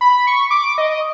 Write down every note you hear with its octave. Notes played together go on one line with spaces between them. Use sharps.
B5
C#6
D6
D#5